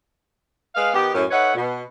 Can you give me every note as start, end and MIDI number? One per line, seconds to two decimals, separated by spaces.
0.75 0.94 56
0.75 0.94 71
0.75 0.94 75
0.75 0.94 77
0.94 1.10 51
0.94 1.10 59
0.94 1.10 67
1.14 1.24 42
1.14 1.24 45
1.31 1.54 57
1.31 1.54 63
1.31 1.54 71
1.31 1.54 73
1.31 1.54 76
1.31 1.54 78
1.55 1.81 47